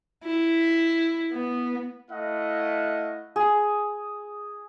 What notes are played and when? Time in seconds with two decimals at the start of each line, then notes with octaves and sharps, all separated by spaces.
0.24 E4
1.34 B3
2.11 A3 E4 D#5 F5 F#5
3.36 G#4